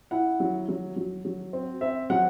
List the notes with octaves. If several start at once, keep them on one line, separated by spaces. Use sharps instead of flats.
E4 F#5
F#3
F#3
F#3
F#3
C4
C4 E5
F#3 F#5